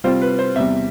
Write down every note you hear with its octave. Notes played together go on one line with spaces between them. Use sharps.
C3 G3 C4 F4 C5
B4
C5
E2 C3 G3 E5